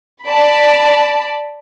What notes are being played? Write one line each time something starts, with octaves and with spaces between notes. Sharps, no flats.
D5 A5 B5